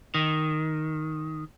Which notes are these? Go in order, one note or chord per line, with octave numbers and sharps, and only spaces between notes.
D#3